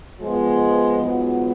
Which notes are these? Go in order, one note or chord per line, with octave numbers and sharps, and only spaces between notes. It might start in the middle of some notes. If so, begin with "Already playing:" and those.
F3 G#3 B3
G#2 F#3 B3 F4